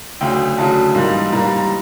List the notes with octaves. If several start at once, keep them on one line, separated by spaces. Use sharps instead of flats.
D2 C#3 F#3 G5
D2 C#3 F#3 A5
G#2 E3 G3 A#3
G#2 E3 G3 A#3 A#5
A#5